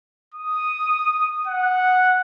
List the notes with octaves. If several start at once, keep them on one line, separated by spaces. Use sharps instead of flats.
D#6
F#5